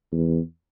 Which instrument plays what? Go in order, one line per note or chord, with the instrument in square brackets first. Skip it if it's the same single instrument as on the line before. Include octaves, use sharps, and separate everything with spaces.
[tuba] E2